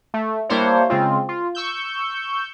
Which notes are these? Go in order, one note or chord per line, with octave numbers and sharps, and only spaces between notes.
A3
G3 A#3 D4 E4 C5 C#5
C#3 G#3 C4 F4
F4
C#6 E6 G6